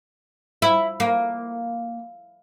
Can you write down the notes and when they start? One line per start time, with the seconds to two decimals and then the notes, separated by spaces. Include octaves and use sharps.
0.62 E4
1.00 A#3